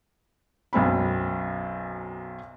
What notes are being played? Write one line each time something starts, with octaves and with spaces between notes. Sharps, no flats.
B1 F#2 C4 B5